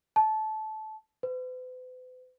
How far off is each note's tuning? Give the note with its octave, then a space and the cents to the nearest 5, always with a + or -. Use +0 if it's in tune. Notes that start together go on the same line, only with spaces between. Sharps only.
A5 -20
B4 +45